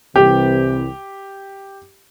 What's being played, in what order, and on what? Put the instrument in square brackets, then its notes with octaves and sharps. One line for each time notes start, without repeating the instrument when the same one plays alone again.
[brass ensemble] C2 C3 E3 [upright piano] G4